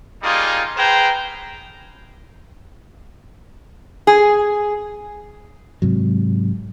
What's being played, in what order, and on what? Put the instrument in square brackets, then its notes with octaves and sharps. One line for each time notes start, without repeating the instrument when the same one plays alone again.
[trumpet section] G3 A#3 D#4 F4 G#4
G#4 B4 C5 G5 A#5
[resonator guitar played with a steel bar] G#4
[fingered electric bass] G#2 C3 F#3